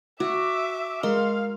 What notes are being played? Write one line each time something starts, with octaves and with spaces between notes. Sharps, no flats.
F#4 E5 D6
G#3 A#4 D#5 F5 C6